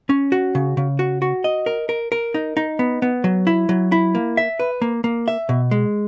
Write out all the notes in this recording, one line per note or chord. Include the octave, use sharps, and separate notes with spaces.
C#4
F#4
C#3
C#3
F#4
F#4
D#5
A#4
A#4
A#4
D#4
D#4
B3
B3
F#3
E4
F#3
E4
A#3
E5
B4
A#3
A#3
E5
B2
G#3